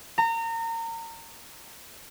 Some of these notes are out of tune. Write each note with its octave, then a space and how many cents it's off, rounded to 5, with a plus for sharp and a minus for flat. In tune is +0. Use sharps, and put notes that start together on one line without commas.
A#5 -30